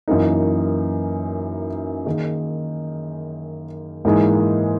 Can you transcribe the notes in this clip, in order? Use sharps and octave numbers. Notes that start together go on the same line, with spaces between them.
F#2 E3 A#3 D#4
D#3 A#3 D#4 G#4
G#2 E3 A#3 D#4 G#4